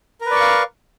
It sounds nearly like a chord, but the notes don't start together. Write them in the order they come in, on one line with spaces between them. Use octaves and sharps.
A#4 B4 D5 C#6 F5